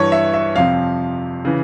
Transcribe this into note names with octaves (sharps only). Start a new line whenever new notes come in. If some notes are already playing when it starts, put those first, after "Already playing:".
Already playing: G2 E3 C#5
E5
E5
F2 C3 F3 F5
C#3 E3